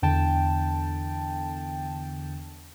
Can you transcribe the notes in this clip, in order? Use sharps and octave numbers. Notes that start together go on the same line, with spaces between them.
E2 D3 G5 A5